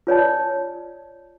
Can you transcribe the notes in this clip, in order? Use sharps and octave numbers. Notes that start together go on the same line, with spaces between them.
F4 C#5 D5 A5